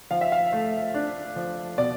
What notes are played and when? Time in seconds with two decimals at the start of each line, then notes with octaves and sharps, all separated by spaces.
0.11 F3 F5
0.21 E5
0.32 F5
0.53 A3
0.94 D4
1.36 F3
1.78 B2 D5